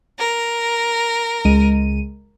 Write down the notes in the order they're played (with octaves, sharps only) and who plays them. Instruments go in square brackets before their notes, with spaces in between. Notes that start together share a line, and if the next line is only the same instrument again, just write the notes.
[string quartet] A#4
[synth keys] C#2 G#3 D#7